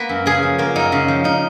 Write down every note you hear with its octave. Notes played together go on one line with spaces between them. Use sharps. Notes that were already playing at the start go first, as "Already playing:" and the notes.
Already playing: A#3 B3 B4
F#2
C#3 G#4
F3
A#3 F4
F#2 D#4
C#3
F3
C#3 D#4